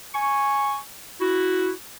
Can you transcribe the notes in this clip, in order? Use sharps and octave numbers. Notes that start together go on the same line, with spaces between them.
G#5 C#6
E4 F#4